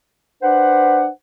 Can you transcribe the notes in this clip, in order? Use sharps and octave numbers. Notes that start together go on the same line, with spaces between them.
D4 B4 C5 F#5